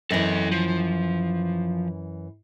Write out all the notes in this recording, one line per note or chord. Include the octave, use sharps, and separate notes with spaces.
F#2 E3 A4 D#5
F3